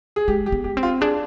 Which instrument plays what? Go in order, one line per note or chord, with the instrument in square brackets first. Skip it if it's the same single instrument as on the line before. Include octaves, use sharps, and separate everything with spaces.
[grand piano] G#4
[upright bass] G#3 [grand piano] G4
[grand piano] G4
[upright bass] B3
[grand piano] G4
[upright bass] C4
[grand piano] F4
[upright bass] D4 [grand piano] G#4